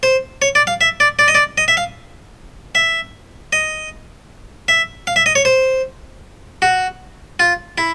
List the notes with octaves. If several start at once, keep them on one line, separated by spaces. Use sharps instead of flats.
C5
C#5
D5
F5
E5
D5
D5
D#5
D5
D#5
E5
F5
E5
D#5
E5
F5
E5
D#5
C#5
C5
F#4
F4
E4